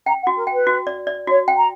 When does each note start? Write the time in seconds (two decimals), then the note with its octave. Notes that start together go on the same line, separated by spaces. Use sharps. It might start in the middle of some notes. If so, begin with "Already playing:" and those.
0.06 G5 A#5
0.22 F#5
0.27 F#4
0.36 A#4
0.47 G5
0.52 B4
0.67 F#4
0.87 D5
1.07 D5
1.27 F#4 C#5
1.48 G5
1.57 A#5